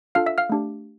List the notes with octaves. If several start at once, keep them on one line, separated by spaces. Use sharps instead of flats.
D4 F4 A4 F5 F6
E5 E6
F5 F6
A3 D4 G4